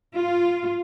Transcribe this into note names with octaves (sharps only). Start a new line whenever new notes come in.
F4